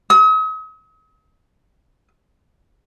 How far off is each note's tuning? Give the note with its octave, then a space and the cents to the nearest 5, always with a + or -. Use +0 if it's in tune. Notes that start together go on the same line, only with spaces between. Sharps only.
D#6 +45